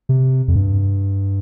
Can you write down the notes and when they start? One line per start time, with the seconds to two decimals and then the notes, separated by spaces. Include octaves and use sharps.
0.09 C3
0.48 F2
0.56 G2